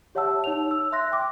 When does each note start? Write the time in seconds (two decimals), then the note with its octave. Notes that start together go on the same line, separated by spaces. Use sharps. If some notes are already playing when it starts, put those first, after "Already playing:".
0.15 G4 C#5 E5 F#5 A5 E6
0.44 D#4 C#5 F7
0.71 E6
0.92 E5 C6 F#6 A#6
1.12 G5 D6